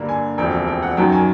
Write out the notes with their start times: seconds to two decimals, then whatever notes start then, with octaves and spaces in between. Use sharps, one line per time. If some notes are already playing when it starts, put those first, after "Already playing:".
Already playing: G2 D3 G3 A#3
0.09 G#5
0.38 E1 D2 C3 F3 G5
0.67 G5
0.83 F#5
0.97 F#2 D#3 F#3 G5
1.13 G#5